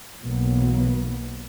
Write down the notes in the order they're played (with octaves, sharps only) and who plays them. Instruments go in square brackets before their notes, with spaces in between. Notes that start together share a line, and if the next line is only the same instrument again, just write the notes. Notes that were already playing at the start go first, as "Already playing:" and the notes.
[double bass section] B1 B2 E3 F#3 A#3 B3